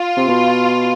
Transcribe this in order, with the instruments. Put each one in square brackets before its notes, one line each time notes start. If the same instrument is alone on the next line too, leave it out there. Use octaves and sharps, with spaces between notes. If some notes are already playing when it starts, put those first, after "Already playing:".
Already playing: [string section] F4
[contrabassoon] C3
B2